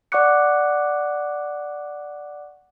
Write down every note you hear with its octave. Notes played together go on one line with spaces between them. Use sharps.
D5 F#5 C#6 D6 F#6 C#7